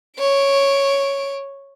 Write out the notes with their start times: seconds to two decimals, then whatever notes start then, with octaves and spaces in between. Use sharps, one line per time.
0.19 C#5 D7